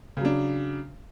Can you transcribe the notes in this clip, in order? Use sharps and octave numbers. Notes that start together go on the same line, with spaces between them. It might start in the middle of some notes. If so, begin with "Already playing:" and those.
C#3 F#3 D4